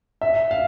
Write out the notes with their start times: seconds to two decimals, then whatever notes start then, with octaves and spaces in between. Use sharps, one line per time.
0.21 E5
0.51 F5